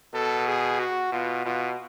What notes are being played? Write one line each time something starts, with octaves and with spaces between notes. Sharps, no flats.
B2 A4
G#4
F#4
B2 F4
B2 F4